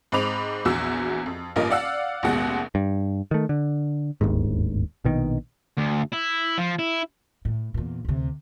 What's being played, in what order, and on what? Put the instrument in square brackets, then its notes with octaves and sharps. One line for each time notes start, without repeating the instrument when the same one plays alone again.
[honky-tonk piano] G#2 C4 D#5 B5 D6 F7
A#1 E2 F#4 E6
F2
A1 G2 A#3 F4 A#4 D#5
D5 F5 F#5 E6
A1 D#2 B2 G#3 F#5
[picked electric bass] G2
D#3 A3
D3
D1 G1 D#2 G#2
A#1 B2 D#3
[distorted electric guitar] D2
E4
F3
E4
[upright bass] A2
E2 A#2
D2 C3